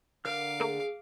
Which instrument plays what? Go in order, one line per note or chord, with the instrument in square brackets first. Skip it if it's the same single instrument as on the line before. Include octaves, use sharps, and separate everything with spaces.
[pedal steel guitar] D3 A#4 F6 [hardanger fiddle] F5 D6
[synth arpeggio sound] A3 A#3 [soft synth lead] G#4